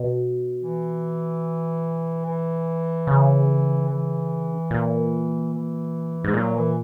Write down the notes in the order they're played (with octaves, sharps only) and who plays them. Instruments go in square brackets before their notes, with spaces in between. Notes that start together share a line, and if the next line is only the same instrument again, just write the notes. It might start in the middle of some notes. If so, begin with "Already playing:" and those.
Already playing: [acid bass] B2
[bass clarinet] E3
E3
[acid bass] C#3
[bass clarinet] E3
[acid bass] A#2
[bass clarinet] E3
[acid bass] G#2
[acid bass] A#2 [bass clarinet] F#3
[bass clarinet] E3